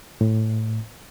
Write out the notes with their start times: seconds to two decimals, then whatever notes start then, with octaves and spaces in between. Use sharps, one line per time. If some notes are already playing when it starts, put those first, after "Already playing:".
0.21 A2